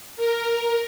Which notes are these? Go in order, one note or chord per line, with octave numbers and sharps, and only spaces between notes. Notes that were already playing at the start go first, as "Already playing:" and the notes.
A#4